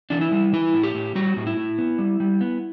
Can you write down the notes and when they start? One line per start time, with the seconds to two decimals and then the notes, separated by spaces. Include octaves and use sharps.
0.10 E3 D4
0.21 E4
0.31 G3
0.53 E3 E4
0.74 A2
0.83 G4
0.95 A2
1.15 G3 F#4
1.36 A2
1.47 E4
1.57 A2
1.78 B3
1.98 G3
2.20 G3
2.41 B3